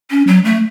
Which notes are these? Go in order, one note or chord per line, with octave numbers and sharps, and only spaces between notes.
C#4
F#3
A3